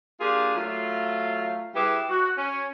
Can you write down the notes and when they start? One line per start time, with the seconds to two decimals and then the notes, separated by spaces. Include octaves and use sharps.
0.20 A#3 D4 F4 G4 G#4
0.56 F#3 A3 F4
1.75 G3 E4 G4 G#4 B4
2.09 F#4
2.37 C#4